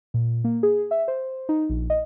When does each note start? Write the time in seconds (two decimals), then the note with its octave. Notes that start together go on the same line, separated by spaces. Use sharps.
0.14 A#2
0.44 A#3
0.63 G#4
0.91 E5
1.08 C5
1.49 D#4
1.69 A#1
1.90 D#5